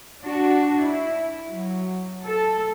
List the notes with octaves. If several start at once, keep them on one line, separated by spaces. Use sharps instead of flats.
D4 F#4
E4
F#3
A4